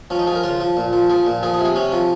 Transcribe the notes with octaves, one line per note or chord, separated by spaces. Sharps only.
F3 C#4
D#4
F3 G#4
A#4
C#3 F4
F3
A#2
F3
F3 G#4
A#2
F3 G#4
G#4
C3
G#4
C3 C#4
F3